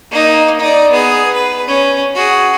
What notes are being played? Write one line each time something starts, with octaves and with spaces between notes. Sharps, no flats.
A#3 D#4
D#4 D5
B3 G#4
B4
C#4
F#4 G#4